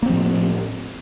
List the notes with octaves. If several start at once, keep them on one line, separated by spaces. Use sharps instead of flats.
A2 F3 A#3 C4